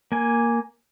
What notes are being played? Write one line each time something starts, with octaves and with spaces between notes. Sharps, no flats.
A#3 G#5